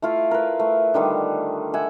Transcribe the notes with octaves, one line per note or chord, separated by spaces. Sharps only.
A3 E4 F4 F5
A#4 B4
A3
D3 D#3 G3
E5 F#5 G#5